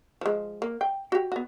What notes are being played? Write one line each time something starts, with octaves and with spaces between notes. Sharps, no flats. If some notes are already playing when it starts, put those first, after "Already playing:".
F3 G#3
A#3
G5
F#4 G4
B3 F#4